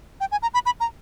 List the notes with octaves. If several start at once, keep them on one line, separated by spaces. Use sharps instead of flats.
G5
G#5
A#5
B5
B5
A#5